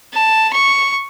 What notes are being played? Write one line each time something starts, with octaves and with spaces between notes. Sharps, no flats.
A5
C#6